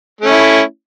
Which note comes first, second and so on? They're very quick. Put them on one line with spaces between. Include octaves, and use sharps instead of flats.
A3 C#4 E4